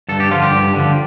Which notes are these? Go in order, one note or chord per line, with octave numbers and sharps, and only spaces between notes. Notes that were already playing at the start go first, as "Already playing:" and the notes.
G2 A4
G4
D3 F3 F4
G4
G2
D3 F3